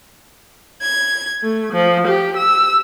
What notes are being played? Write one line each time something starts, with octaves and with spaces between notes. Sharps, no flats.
G#6
A3
F3
G4
E6